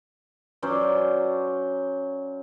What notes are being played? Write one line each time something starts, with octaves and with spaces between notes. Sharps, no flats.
F#3 C#4 C5 D5